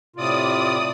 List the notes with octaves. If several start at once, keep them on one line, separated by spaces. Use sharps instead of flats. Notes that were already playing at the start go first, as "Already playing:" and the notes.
A2 C3 F4 D5 D#6